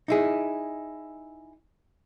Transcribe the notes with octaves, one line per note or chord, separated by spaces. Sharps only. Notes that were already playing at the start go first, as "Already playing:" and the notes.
D#4 E4 G#4